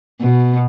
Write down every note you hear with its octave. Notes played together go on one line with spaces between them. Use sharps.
B2